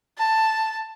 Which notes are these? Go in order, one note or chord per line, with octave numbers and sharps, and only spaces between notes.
A5